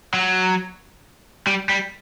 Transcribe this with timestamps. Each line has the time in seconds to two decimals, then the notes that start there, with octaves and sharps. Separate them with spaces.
0.14 F#3
1.47 G3
1.69 G3